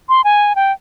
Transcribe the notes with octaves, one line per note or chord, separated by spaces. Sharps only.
C6
G#5
G5